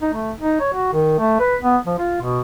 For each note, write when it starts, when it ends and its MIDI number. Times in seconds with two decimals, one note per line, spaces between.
0.02 0.12 63
0.13 0.32 57
0.39 0.59 63
0.60 0.71 73
0.73 0.90 66
0.93 1.17 51
1.19 1.38 57
1.40 1.56 71
1.62 1.78 59
1.87 1.96 53
1.98 2.18 65
2.22 2.41 47